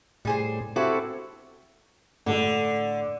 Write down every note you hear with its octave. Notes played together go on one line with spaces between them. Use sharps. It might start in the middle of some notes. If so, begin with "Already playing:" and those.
A2 G3 G#4 C5
C4 E4 F#4 G4 A4
A2 D3 A3